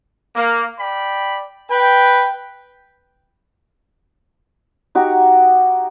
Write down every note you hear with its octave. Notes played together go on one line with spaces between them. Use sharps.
A#3
D5 G5 B5
B4 G5
D#4 F#4 G4